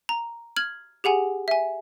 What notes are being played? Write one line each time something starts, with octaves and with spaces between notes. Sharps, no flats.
A#5
F6 G#6 F#7
G4 G#4 F#5 G#5
E5 G#5